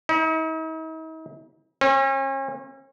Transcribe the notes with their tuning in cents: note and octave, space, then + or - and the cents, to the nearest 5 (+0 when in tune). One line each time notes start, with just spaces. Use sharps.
D#4 +45
C#4 -40